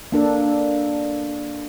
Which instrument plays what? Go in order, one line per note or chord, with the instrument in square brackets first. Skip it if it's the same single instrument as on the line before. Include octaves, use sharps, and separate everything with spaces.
[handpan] A#3 D4 A4